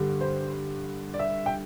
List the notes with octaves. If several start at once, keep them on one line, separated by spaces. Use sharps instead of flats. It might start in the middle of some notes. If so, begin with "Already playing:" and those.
Already playing: G2 D3 G3
C5
D5
E5
G5